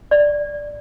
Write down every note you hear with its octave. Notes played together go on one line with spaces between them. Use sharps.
D5